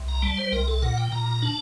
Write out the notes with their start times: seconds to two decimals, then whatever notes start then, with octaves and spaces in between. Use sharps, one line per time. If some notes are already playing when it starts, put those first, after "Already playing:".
Already playing: C2
0.08 A#5
0.22 G3 A5
0.38 C5
0.52 C2 A#4
0.68 A4
0.82 A#2 F#5
0.98 G5
1.12 A#2 A#5
1.42 D4 A5